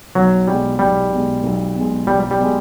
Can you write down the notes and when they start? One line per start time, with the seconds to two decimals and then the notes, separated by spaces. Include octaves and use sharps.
0.15 B1 F#3
0.47 B2 G3 G#3
0.79 B1 G3
1.11 B2 G#3
1.43 B1
1.75 B2 G#3
2.07 B1 G3
2.31 G3
2.39 B2 G#3